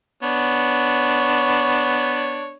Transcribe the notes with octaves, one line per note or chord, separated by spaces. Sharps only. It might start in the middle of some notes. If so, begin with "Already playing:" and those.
B3 D4 C#5